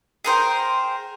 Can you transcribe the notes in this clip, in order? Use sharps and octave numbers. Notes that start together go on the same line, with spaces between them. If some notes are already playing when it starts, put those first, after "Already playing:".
G#4 A#4 C5 G5